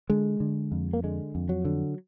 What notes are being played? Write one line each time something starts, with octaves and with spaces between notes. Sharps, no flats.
D3 G#3
D3
F2
A#3
D3 G#3
F2
F#3
D3